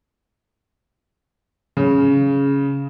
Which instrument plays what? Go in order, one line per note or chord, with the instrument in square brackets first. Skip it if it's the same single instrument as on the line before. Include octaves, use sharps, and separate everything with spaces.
[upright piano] C#3